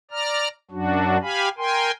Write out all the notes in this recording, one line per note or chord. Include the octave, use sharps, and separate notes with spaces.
D5 A#5 F6
F#2 F#3 D4 F#4
G4 F5 G#5 B5
A#4 G5 G#5 C6